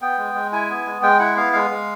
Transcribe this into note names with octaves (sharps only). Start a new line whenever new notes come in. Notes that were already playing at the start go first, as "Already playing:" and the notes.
B3 G5
G#3
G#3
E4 G#5
B3
G#3
G#3 G5
E4 F#5
B3 F5
G#3 F5
G#3